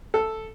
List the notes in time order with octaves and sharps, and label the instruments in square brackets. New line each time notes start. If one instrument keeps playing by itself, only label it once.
[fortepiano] A4